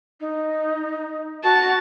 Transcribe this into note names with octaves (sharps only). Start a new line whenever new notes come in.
D#4
F#4 A5